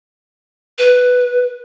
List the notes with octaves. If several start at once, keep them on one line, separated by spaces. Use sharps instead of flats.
B4